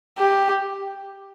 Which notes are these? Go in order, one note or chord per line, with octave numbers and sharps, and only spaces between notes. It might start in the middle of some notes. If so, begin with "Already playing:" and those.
G4